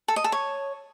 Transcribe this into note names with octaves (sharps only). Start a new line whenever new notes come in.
A4
D#5
A4
C#5